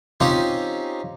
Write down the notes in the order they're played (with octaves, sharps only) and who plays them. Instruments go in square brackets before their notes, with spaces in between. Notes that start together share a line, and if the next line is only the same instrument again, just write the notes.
[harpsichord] C4 C#4 D#4 F4 G4